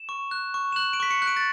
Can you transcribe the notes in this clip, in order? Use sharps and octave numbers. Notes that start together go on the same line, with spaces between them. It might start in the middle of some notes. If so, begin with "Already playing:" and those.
Already playing: E7
C#6
F#6
C#6
E7
F#6 F#7
D7
C#6 B6
C#7
F#6
D7
A6